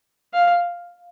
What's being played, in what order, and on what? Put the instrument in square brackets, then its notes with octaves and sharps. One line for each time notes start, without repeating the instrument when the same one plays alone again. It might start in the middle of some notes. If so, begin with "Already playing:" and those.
[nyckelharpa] F5